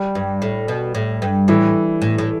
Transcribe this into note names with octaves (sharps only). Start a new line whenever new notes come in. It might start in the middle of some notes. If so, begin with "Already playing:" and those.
Already playing: G3
G2
A2
B2
A2
G2
A2 E3
A2
A2